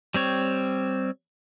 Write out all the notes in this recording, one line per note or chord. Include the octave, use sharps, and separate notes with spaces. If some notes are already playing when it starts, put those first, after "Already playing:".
G3 C4 C#5